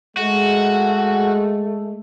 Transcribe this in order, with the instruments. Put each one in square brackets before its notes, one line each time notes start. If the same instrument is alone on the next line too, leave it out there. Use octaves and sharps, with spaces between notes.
[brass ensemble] G#3 [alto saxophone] A3 [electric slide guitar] F#4